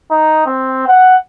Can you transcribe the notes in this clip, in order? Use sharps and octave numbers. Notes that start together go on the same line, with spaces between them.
D#4
C4
F#5